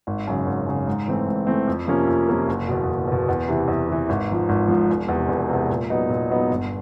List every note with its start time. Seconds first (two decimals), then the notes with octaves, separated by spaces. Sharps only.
0.07 G#1
0.27 F#2 C#3
0.46 G#1
0.67 F#2 C#3
0.87 G#2
1.08 E3 A3 C4
1.27 G#2
1.47 E3 A3 C4
1.68 F2
1.87 C3 F3 A#3 C#4
2.07 F2
2.28 C3 F3 A#3 C#4
2.48 F#1
2.68 E2 B2
2.88 F#1
3.07 E2 B2
3.29 E2
3.48 C3 E3
3.68 E2
3.89 C3 E3
4.09 G#1
4.28 G#2 F3
4.49 G#1
4.68 G#2 F3
4.90 E1
5.08 E2 C3
5.29 E1
5.49 E2 C3
5.70 A#2
5.90 F#3 B3 D#4
6.10 A#2
6.30 F#3 B3 D#4
6.49 G1